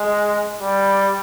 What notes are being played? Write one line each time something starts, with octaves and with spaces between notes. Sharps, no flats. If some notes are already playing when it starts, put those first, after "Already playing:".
Already playing: G#3
G3